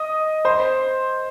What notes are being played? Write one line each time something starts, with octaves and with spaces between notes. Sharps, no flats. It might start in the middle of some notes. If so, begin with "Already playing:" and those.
Already playing: D#5 D#6
C5 C6